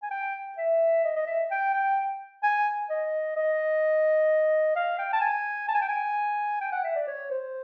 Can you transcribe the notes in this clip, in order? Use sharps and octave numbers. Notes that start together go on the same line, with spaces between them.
G#5
G5
E5
D#5
D#5
E5
G5
G5
G#5
D#5
D#5
F5
G5
A5
G#5
A5
G#5
G5
G#5
G5
F#5
E5
D5
C#5
C5